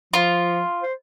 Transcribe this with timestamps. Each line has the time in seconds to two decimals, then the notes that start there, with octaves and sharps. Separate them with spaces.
0.14 F3 F4
0.82 C5